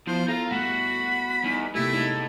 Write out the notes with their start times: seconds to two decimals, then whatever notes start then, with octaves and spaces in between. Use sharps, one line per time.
0.07 F3 B3 E4 C5
0.28 F4 A4 F5 A#5
0.51 G3 A3 F#4 B5
1.44 E2 G3 D#4
1.75 C3 A3 A#3 E4 G4
1.94 A2 G#3 D#4